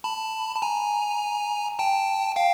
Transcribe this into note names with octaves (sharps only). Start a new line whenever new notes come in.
A5 B5
A5
G#5 A#5
G5 A5
F5 G5